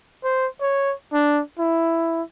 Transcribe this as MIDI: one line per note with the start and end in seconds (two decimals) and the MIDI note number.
0.24 0.47 72
0.61 0.94 73
1.13 1.41 62
1.59 2.22 64